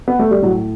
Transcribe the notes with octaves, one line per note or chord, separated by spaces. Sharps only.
B3
A3
G3
A2 F#3